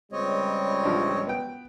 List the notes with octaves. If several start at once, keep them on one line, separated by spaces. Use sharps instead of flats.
C#2 G3 C4 C#5 D#5
A1 F3 D4
B3 G5